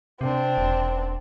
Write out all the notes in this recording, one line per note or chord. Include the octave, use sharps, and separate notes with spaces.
C3 C4 D4
E1